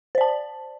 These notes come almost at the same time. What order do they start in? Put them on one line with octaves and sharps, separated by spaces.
C5 D5 A5